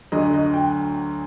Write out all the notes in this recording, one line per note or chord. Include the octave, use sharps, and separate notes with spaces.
D2 D3 F#3 D#5
D#5
G5